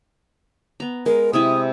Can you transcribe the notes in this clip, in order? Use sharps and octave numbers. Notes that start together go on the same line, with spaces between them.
B3 A#5
G#3 A#4
C3 C4 E4 D#6